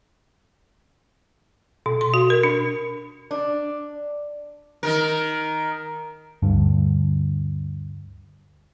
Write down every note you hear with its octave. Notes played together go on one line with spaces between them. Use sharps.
B2
C6
F#4
A#4
D4
D4
D#3 A#4
D2 G2 D3